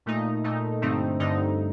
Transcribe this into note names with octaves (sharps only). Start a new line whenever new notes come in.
A#2 A3 D#4
A#2 A3 D#4
G2 D3 A3 C4 D#4
G2 D3 A3 C4 D#4